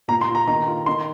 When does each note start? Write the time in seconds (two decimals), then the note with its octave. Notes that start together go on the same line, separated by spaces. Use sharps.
0.08 A#2 A#5
0.21 C6
0.29 F4
0.35 A#5
0.47 D#3 A#5
0.68 F4
0.86 D#3 C6